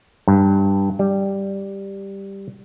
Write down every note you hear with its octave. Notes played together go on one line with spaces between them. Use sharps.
G2
G3